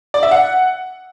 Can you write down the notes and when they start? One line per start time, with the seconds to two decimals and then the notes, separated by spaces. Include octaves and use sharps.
0.14 D5
0.23 E5
0.31 F#5